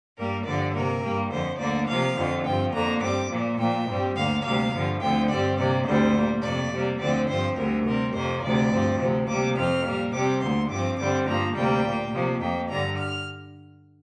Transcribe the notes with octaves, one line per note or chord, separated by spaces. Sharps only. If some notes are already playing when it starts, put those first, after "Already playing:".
G2 G3 A#3 A#4
G2 D3 F3 D5
C3 A#3 A#4
G2 G3 A#3
F2 D3 F3 C5
D2 D3 A#3 D5
C3 F3 A#3 F5
F2 D3 F3 C4
G2 F3 C4 G5
F2 D3 A#3 A#5
G2 G3 C4 D6
A#2 F3 A#3
A#2 F3 A#3 G5
G2 G3 C4
D2 D3 A#3 F5
D2 C3 G3 A#3 F5
G2 D3 F3
D2 D3 F3 C4 G5
G2 G3 C4 D5
C3 A#3 D5
D2 D3 G3 C4 C5
A#2 G3 A#3
F2 C3 A#3 D5
C3 G3 A#3
D2 D3 F3 C4 D5
G2 F3 C4 C5
D2 D3 G3 A#4
C3 G3 C4 A#4
F2 C3 F3 A#3 C5
D2 C3 F3 D5
G2 F3 C4
D2 C3 F3 C4
C3 G3 A#3 D6
F2 F3 C4 F6
A#2 G3 A#3
C3 G3 C4 D6
D2 D3 A#3 C6
G2 F3 C4 D6
G2 D3 G3 C4 D6
G2 F3 A#3 A#5
D2 C3 G3 A#3 G5
A#2 A#3
C3 F3 A#3
F2 F3 A#3 G5
G2 D3 G3 A#5
F6